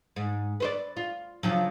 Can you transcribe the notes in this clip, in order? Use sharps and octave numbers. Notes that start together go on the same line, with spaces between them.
G#2
B4 C5 D5
F4
C#3 F3 F#3